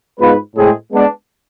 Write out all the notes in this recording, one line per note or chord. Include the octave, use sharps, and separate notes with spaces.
G#2 G#3 B3 F4 B4
A2 G#3 C4 G#4
G#3 B3 D4